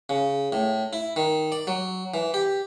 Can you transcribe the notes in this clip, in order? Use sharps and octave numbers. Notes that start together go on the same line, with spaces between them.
C#3
A2
E4
D#3
D5
F#3
E3
G4